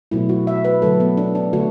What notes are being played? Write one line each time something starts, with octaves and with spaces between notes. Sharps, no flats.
B2 F#3 A3 E4
F#4
E5
B4
D3 F#3 A3 A4
B3
D4
D4
D3 A3 F#4